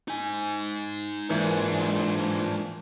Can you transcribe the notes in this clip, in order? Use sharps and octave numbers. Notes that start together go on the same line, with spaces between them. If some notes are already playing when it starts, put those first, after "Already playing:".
D#4 G#5
G#2 E3 F3 A#3 D4